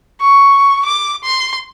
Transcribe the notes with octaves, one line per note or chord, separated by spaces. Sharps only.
C#6
D6
C6